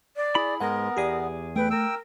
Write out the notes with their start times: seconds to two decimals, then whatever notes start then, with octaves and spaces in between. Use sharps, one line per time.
0.16 D5
0.35 E4 G#4 B5
0.60 G#2 G#3 B3 A#4 F#5
0.97 E2 G4 G#4 D5
1.56 A3 B4 G5
1.71 A#4 G5 E6